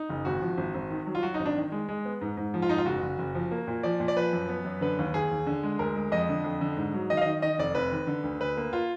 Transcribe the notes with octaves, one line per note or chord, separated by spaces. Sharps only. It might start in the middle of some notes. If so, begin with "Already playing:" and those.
Already playing: D#4
F#1
G#1 F#4
F3
G#1
G#1
D#3
F#3
F4
F#3 F#4
D#4
G#1
D4
D#3
G#3
G#3
B3
G#2
G#2
F3
F4
G#2 D#4
F4
F#1 F#4
F#1
F#1
F3
A#3
A#2
F3 D5
A#2
D5
F3 B4
F#2
B3
F#2
D3 B4
D#2
D#2 G#4
D#2
D3
G#3
D2 A#4
G#3
F2 D#5
D3
F2
D3
G#2
F#3
D#3 D#5
F5
D#3 D#5
D#3 D#5
F1 D5
F1 B4
D#3
D3
D2
D2 B4
A#3
F4